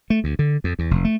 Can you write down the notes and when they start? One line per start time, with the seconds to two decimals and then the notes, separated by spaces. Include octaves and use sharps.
0.10 A3
0.24 D2
0.39 D3
0.64 F2
0.79 E2
0.91 F1
1.04 A3